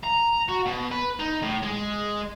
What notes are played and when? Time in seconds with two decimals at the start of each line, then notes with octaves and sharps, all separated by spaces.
0.03 A#5
0.49 F#4
0.66 B2
0.91 B4
1.19 D#4
1.42 A2
1.62 G#3